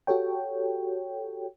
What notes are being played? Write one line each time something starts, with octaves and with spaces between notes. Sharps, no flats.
F#4 G4 A4 C#5 G5